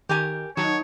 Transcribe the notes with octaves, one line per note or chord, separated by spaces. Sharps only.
D#3 G4 A#4 G#5
D#3 F#3 D#4 C#5 A5